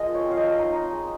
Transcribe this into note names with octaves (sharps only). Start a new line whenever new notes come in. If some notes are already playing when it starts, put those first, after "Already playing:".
Already playing: F3 G#3 A#4 D#5
F4
C#5
C4
F5
D#5
F3
D#4
D#4
G#3